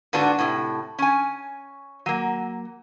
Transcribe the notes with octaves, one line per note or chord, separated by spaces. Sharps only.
G#2 D3 B3 D4 F#4
A2 C3
C#4 G#5
F#3 A#3